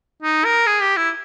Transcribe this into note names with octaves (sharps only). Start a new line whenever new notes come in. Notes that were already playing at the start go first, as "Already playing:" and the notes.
D#4
A#4
G#4
G4
E4